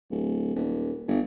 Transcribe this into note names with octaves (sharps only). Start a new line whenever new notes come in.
D1
D#1
G1